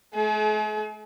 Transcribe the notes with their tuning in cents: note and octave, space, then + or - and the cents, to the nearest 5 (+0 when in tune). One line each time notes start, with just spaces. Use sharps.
A3 -45 G#4 +40